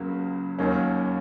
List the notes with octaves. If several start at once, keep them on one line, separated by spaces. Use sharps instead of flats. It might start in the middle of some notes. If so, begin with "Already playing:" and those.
Already playing: C#2 C#3 F#3 A#3
D#2 D#3 F#3 A#3 C#4